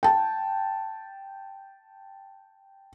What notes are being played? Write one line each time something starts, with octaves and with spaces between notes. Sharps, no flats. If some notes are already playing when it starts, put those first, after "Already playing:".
G5 A5